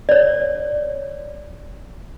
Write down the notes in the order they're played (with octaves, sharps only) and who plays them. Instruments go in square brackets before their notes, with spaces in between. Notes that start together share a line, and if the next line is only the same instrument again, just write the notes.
[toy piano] C#5 D5